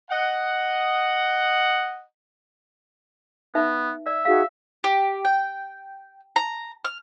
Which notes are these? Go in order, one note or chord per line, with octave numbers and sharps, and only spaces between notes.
D#5 F#5
B3 D#4 B4 E5
D5 E5
D#4 F#4 G#4 F5
G4
G5
A#5
F6